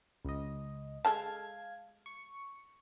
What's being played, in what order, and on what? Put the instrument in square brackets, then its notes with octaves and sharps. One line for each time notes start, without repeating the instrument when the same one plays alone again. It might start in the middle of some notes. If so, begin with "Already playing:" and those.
[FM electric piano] C#2 D#5
[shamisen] G#3 A4 A5 [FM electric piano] F5 G#6
[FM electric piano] C#6